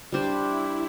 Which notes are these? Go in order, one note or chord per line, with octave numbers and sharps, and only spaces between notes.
G3 D4 E4 G4 C5